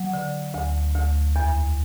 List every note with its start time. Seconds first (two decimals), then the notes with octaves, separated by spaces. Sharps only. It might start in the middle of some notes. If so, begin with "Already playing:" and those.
Already playing: F#3
0.13 D3
0.54 D2
0.95 D2
1.36 E2